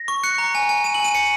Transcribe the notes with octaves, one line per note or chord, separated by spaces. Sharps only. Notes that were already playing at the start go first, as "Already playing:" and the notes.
Already playing: A#6
C#6
F#6 C#7
A#5
G#5
G#5
G#5 D#7
F#7
G#5 D#7
G#5 C#7